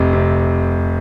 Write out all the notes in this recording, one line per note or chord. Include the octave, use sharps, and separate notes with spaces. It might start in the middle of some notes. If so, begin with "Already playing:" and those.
Already playing: F1 C3
C3